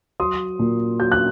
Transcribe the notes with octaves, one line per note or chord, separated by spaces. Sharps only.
F#3 C6 D#6
A#2
F#3 G6
F#6